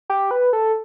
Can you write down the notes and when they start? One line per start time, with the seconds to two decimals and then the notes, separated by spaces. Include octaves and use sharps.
0.10 G4
0.31 B4
0.53 A4